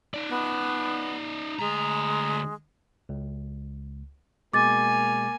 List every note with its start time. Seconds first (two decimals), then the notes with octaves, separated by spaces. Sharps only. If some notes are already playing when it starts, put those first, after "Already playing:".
0.14 D#4 D5
0.29 B3
1.59 D2 G#3 A#5
3.09 C#2
4.53 B2 G#3 A#3 G#5 D6 A6